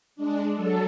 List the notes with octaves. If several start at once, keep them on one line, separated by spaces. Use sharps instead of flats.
G#3 D4
F#3 A4